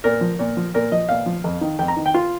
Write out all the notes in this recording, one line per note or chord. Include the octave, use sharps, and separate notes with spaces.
A#2 A#4
F3
A#2
F3
A#2 A#4
F3 D#5
A#2 F5
F3
F2
D#3
F2 G5
A#5
D#3
G5
F4